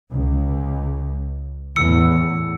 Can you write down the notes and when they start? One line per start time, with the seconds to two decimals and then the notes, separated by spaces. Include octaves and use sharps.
0.11 C#2
1.76 E2 A2 E6 C#7